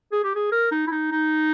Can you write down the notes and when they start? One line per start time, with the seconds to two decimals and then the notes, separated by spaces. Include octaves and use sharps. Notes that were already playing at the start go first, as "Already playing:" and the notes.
0.12 G#4
0.24 G4
0.35 G#4
0.52 A#4
0.71 D#4
0.87 E4
0.92 D#4
1.11 D#4